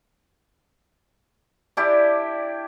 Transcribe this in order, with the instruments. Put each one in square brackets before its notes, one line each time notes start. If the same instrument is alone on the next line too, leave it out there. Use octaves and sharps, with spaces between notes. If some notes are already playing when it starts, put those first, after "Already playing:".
[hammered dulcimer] D4 E4 G4 D5